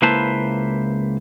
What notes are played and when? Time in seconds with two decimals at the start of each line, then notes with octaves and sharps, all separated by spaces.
0.02 C#2 A#3 E4 B4 C5 A5